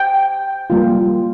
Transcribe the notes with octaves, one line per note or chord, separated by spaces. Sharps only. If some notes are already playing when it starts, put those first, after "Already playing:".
Already playing: G5
G3 A#3 F4